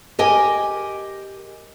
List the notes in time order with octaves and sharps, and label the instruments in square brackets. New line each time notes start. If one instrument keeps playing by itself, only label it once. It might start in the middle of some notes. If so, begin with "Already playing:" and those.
[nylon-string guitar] G4 A#4 D#5 G#5